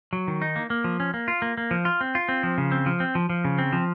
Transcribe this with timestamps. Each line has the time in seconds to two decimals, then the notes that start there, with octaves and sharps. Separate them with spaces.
0.13 F#3
0.28 D#3
0.42 D#4
0.56 A#3
0.70 A#3
0.84 F3
1.00 C#4
1.14 A#3
1.28 F4
1.42 A#3
1.58 A#3
1.71 F3
1.85 F4
2.01 C4
2.15 F4
2.29 C4
2.43 F3
2.58 C#3
2.72 C4
2.86 F3
3.00 C4
3.15 F3
3.30 F3
3.45 C#3
3.58 C4
3.72 F3